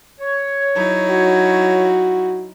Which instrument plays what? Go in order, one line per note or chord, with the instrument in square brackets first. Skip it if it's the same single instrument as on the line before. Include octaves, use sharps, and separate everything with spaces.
[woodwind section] C#5
[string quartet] F#3 D#4 E4
[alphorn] F#4